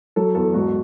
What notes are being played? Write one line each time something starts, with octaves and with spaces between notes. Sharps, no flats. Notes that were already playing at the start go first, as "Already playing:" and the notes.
F#3 A4
E2 A4
G#2 F#4